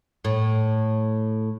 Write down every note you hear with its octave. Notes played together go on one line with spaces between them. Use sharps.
A2